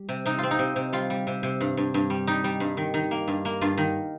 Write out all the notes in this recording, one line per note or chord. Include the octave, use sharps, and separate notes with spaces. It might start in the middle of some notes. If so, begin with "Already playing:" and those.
Already playing: G3
C3
C3 D#4
C4 F4
D#4
C3
C3
G3 F4
G3
C3
C3
G2
G2
G2
G3
G3 D#4
G3
G2
D#3
D#3
A#3
G2
A#3
G2 F4
D#3